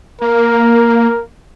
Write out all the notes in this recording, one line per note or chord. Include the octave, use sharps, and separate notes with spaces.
A#3 A#4